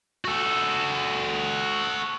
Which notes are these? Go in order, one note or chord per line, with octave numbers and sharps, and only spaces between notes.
F#4 A4